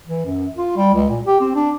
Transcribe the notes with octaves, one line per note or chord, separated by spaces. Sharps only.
E3
F#2
F4
G3
C#2
A#2
G4
C4
D4